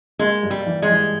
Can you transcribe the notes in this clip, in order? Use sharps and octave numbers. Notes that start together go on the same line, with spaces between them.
G#3 A#3
G2
G3
E3
G#3
E3